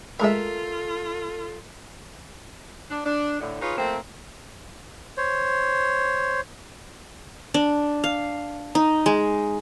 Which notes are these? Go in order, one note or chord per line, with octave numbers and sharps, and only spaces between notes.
G#3 A3 F4 A4 A#4 E5 B5
D4
D4
A2 D3
D#4 F4 G#4 B4 C#5 F5
F3 A3 A#3 C4
C5 C#5
D4
F5
D#4
G#3